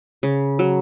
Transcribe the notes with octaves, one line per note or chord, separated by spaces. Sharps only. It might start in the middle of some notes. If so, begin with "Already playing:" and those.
C#3
F#3